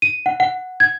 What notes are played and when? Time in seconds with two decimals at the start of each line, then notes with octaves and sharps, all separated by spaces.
0.02 D#7
0.26 F#5
0.40 F#5
0.80 G#6